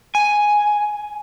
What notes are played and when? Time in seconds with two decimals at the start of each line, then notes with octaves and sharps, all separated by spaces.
0.15 G#5